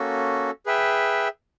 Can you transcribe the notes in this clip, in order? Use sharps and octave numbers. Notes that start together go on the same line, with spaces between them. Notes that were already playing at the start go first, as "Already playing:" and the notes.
Already playing: A#3 C#4 F#4 A4
G#4 B4 E5 G5